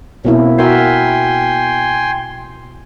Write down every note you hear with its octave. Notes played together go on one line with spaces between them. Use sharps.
B2 A#3 C4 C#4 E4
F#4 A#4 E5 G5 G#5 C6